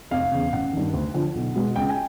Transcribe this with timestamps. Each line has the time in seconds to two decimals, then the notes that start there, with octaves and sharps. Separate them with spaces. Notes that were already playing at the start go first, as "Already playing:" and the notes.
0.11 F1 F5
0.32 E2 C#3
0.53 A1 F#5
0.73 G2 D#3
0.93 D2
1.14 D3 F3
1.35 B1
1.55 B2 G#3
1.76 C#2 G5
1.90 G#5